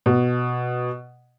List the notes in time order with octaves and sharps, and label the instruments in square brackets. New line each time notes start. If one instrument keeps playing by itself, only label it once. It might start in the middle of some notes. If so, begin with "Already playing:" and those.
[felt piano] B2